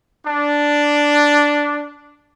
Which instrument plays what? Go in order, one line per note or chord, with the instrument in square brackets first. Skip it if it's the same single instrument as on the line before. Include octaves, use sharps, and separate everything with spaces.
[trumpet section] D4